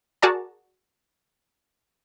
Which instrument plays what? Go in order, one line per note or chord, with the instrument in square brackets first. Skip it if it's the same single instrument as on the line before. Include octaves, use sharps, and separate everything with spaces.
[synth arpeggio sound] F#4 G#4 A#4 D5 A5 A#5